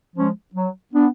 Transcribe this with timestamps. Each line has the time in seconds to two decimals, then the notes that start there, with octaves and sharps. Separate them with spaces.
0.16 F3 G#3 C#4
0.54 F#3
0.93 B3 D4